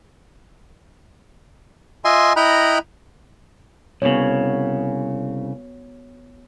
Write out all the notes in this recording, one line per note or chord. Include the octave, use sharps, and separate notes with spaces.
F4 D#5 E5 G#5 C6
E4 D#5 G5 A#5 B5 F#6
C2 C#3 B3 F#4 C#5